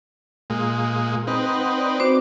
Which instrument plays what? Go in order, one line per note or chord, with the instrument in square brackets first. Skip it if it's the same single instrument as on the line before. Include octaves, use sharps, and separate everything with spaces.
[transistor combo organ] A#2 G#3
C4 D#4 B4
[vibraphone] F#5
D5
[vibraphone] C4 F#4 C5 [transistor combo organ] D6